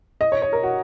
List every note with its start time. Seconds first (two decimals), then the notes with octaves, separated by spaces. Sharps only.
0.21 D#5
0.32 C#5
0.42 C#5
0.53 A#4
0.63 F#4